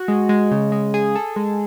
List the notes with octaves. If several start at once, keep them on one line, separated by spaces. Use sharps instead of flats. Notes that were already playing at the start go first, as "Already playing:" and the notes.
Already playing: F#4
G#3
G#3
C#3
G#3
G#4
A4
G#3